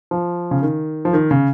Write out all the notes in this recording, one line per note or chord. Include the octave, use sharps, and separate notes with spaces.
F3
C#3
D#3
F3
D#3
C#3